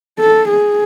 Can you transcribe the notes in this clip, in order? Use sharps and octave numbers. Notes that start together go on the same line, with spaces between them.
A4
G#4